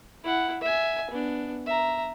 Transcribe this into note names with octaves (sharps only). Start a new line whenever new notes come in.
E4 F#5
E5 G#5
B3 D4
E5 A#5